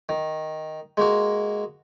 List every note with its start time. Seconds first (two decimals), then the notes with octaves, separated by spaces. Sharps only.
0.09 D#3
0.97 G#3 A#3 F#4